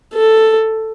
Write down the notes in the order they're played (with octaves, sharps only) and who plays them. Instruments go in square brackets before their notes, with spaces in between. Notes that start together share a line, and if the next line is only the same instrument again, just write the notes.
[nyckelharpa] A4